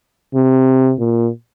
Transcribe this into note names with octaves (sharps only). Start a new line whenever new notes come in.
C3
A#2